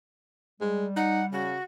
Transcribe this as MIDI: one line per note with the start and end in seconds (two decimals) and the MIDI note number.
0.61 1.51 55
0.61 0.86 56
0.96 1.21 63
0.96 1.25 78
1.32 1.57 49
1.32 1.63 66